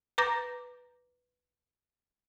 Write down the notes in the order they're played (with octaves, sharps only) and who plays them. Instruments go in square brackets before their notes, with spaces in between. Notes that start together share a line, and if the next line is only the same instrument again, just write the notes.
[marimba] B4 A#5 D6 G6 A#6